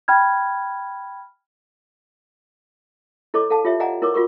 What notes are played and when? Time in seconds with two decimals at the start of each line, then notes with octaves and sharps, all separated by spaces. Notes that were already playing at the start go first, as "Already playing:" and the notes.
0.08 G5 B5 F6 G#6
3.34 E4 A4 C#5 D#5 D6
3.50 A4 F5 A5
3.65 F4 G4 C#5 E5
3.80 D5 D#5 F5 F#5 G#5 A#5
4.02 E4 A#4 C#5 D6
4.14 F4 F#4 A#4 C#6